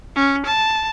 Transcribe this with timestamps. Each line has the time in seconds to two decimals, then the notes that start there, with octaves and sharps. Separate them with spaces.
0.16 C#4
0.46 A5